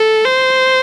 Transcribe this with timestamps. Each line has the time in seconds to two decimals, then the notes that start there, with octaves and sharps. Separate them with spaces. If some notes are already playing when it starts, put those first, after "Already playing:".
Already playing: A4
0.25 C5